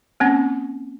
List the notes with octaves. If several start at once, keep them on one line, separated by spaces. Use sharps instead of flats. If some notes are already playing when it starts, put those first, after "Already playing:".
A#3 C4 C#4